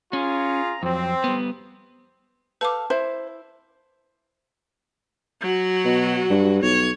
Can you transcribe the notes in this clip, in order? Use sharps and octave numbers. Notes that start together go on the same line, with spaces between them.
C#4 F4 G#4 A#5
F2 F#3 C4
G3 B3
A4 B4 F5 D6
E4 C5
F#3 F#4
B2
G2
B1 C#5